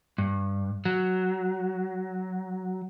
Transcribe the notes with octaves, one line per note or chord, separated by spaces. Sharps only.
G2
F#3